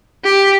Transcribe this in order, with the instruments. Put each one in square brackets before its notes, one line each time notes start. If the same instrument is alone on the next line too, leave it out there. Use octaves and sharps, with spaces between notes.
[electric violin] G4